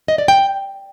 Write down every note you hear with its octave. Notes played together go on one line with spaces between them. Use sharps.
D#5
D5
G5